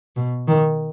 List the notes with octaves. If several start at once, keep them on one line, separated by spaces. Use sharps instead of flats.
B2
D#3